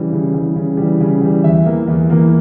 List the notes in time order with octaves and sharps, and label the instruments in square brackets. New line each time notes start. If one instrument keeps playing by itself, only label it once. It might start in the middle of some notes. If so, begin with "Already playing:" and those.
Already playing: [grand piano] C#3 E3 G3
C#3
E3 G3
C#3
E3 G3
C#3
E3 G3
E2 E5
E3 A#3
E2
E3 A#3